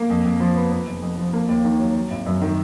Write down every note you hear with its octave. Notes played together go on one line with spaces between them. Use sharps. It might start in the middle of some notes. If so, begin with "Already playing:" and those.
Already playing: A#3
F2
F2
F3
B3
B3
F1
F2
F3
A#3
D#2
D#3
F#3
F#3
G#1
F#2
D#3